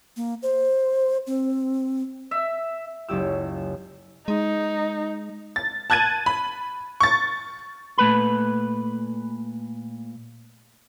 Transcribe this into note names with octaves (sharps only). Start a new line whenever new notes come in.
A#3
C5
C4
E5
F#1 C#2 G4 E6
G#3 D#4
A6
A5 F#6 G#6 A6 D#7
B5
C#6 A6
A#2 A3 B4 B5